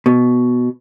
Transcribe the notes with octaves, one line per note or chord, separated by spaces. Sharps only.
B2